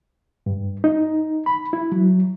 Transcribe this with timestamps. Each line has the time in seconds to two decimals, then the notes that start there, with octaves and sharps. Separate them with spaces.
0.46 G2
0.84 D#4
1.46 B5
1.73 E4
1.92 F#3